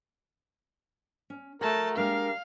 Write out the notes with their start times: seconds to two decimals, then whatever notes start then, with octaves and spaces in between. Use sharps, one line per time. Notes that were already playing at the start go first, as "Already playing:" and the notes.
1.30 C#4
1.61 A3 F#4 A#4 F#5 A5 A#5
1.97 G#3 A#3 D4 G4 A#4 F5